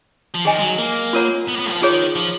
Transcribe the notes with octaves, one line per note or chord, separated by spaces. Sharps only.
F3
D#3 G#4 D#5 G#5
G#3
F#3
A#3
F4 A#4 C#5 F#5 A#5
B3
A#3
B3
F3
D#3 F4 G#4 C#5
F3